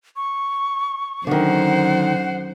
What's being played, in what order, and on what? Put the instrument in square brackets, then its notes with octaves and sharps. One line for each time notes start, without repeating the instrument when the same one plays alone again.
[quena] C#6
[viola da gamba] F#2 C5 [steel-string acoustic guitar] D3 D#3 [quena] F#5